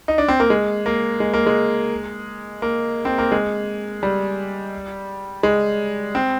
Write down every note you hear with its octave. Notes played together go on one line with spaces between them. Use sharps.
D#4
D4
C4
A#3
G#3
A#3
G#3
A#3
G#3
A#3
C4
A#3
G#3
G3
G#3
C4